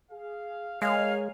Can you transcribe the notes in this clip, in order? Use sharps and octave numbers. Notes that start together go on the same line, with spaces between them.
G#4 F5
G#3 A#4 C#5 F5 G#5